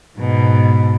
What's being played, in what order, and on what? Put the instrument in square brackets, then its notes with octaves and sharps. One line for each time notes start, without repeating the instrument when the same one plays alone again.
[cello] G#2 B2